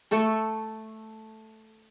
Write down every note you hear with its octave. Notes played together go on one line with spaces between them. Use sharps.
A3 A4 C#6